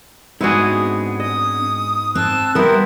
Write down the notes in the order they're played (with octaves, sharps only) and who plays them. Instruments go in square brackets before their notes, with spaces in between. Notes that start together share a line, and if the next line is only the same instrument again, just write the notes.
[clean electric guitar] G#2 B3 G#4 [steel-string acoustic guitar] C4 D4 [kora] E4 F#4
[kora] D#5 [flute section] D#6
[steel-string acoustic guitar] C4 [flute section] A5 E6 F#6
[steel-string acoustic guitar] G3 A#4 [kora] B3 C4 [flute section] E4